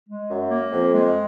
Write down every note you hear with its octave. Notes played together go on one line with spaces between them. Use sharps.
G#3
F#2
A#3
F2
G#3